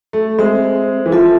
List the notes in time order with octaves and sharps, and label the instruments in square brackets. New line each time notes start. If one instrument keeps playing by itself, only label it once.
[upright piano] A3
[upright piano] G#3 [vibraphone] C4 G#4 C5 E5
[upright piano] E3
[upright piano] F3 [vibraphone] F4 A4 E5